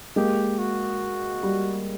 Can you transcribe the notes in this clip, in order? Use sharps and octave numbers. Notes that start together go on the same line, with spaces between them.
G#3 A#3 G4
F#4
G3